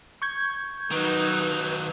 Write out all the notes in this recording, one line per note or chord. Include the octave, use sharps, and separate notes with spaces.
C#6 G6 G#6
D#3 F#3 D#4 B4